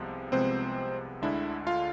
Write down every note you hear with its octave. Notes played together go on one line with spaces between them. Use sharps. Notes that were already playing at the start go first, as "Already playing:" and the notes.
Already playing: C2 C3 F3 G#3 B3
C2 C3 F3 G#3 B3 C4 C5
D2 D3 G#3 D4 E4 E5
F4 F5